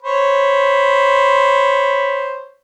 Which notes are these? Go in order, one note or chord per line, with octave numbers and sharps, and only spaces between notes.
C5 C#5 B5